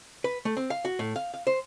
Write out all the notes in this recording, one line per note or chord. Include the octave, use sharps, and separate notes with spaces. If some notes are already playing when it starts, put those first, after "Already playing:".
B4
A3
C4
F5
F#4
A2
F5
F5
C5